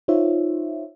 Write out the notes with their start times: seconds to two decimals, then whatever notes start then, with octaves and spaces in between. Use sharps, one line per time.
0.08 D#4 F4 C5 C#5 E5